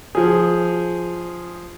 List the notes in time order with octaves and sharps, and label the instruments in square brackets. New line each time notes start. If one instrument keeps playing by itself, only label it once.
[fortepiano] F3 G#4